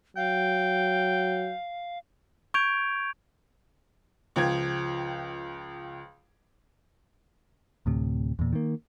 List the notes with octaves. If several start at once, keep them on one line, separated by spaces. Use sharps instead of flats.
F#3 F5 G5
C#6 G6 G#6 D7 F7
C#2 F3 G5 G#6
D2 A2 C3
E2 A#2
D#3 A#3